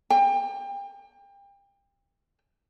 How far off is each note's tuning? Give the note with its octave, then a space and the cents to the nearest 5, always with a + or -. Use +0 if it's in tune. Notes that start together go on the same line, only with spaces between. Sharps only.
G5 +30